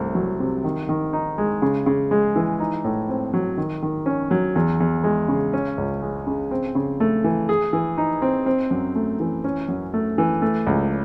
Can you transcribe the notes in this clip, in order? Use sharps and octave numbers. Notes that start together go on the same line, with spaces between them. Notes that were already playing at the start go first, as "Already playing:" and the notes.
Already playing: C2 A3
F#3
C3
D#3
D#3
D#4
G#3
C#3
C#3
G#3
E3
D#4
A2
C4
F#3
D#3
D#3
C#4
F#3
E2
E2
G#3
C#3
C#4
C#2
G#3
C#3
C4
C#3
A3
E3
G#4
E3
D#4
C4
C4
F#2
A3
E3
C#4
F#2
A3
E3
A3
C#2